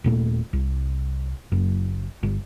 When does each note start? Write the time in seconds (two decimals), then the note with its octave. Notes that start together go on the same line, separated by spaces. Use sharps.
0.04 D#1 A#2 A3
0.53 C2
1.52 F#1 F#2
2.23 G1